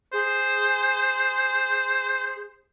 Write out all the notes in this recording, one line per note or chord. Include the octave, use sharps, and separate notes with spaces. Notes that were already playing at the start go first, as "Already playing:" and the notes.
G#4 C5